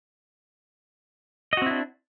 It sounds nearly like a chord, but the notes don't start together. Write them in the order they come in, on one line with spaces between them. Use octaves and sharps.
D#5 F#4 C4 E4 D4